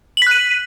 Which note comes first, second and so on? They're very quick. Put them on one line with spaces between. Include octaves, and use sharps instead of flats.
F#7 B6 F#6 D#7